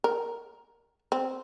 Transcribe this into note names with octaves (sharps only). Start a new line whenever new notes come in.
A#4
C4